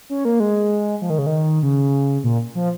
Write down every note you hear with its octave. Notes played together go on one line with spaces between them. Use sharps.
C#4
A#3
G#3
F3
D#3
C#3
D#3
C#3
A#2
F3